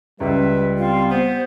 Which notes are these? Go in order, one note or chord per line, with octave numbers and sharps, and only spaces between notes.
C#2 G3 B4 E5
C4 F4
B3 C5